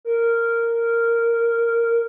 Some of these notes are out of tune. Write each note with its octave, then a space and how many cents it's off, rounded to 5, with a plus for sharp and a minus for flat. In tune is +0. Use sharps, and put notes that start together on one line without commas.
A#4 -10